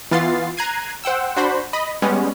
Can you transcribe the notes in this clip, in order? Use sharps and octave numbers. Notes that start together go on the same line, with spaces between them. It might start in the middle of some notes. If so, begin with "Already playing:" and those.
E3 B3 F4 A6 C7
A#5 F#6 G#6 C7 D#7
C5 F#5 G5 E6
D4 F#4 C5 B5
D#5 B5
G3 G#3 B3 C#4